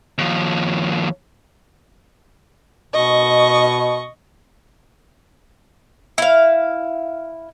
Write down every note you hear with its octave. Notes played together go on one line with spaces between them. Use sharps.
D#2 F3
B2 D#5 C#6
E4 F5